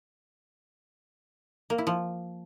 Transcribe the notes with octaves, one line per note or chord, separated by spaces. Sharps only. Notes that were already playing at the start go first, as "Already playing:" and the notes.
A#3
E4
F3